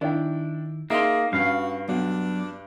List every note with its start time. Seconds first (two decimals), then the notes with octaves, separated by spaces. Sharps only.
0.01 D#3 D4 E4 G5
0.90 A#3 D#4 G#4 E5 C6
1.33 G2 C#4 F#4 F5
1.89 F#3 B3 D4 F#4